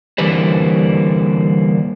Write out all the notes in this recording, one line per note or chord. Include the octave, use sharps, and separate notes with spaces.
D3 E3 G3 A#3 B4 C5